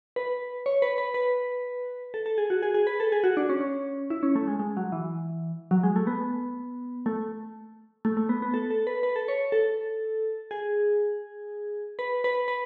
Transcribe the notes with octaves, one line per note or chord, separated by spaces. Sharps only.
B4
C#5
B4
B4
B4
A4
A4
G#4
F#4
G#4
G#4
B4
A4
G#4
F#4
D4
C#4
C#4
E4
C#4
A3
G#3
G#3
F#3
E3
F#3
G#3
A3
B3
A3
A3
A3
B3
B3
A4
A4
B4
B4
A4
C#5
A4
G#4
B4
B4
B4